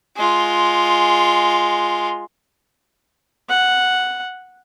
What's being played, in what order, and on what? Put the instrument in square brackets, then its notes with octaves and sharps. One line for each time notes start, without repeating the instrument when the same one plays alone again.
[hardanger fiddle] G#3 F4
[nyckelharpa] F#5